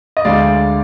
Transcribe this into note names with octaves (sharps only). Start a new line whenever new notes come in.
D#5
D2 D3 G#3 D5 F5